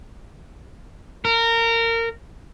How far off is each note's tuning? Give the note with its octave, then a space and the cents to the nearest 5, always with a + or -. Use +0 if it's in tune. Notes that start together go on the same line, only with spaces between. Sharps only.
A#4 -20